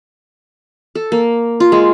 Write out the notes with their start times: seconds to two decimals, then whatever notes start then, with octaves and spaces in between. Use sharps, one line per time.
0.95 A4
1.12 A#3
1.60 F4
1.72 G#3